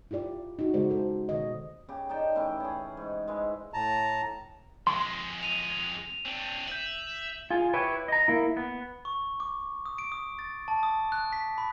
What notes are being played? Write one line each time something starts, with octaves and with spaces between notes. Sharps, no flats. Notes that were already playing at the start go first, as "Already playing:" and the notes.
E4 F4 G4 D5
D#4 F#4
C#3 G#3 D#4 F#4 C5 D5
A4 C5
B2 D#3 C#5 D#5
C#3 G4
D#4 D5 G5 A5
A2 E3 C#4 G5
C#4 G#4
G#2
E3 G#3
A2 A5 A#5
F2 G#3 C6
D#7 F7
C4 D4
E5 G6 F#7
F4 G#4
E4 G4 B4 C#5
D#5 A#5
A#3 E4
B3
C#6
D6
D#6
D7
D#6
A6
A5
D#6
F#6
B6
B5